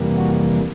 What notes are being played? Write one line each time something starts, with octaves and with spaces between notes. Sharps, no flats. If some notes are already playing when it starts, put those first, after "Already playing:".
Already playing: F2 C3 E3 G3 A#3
F#4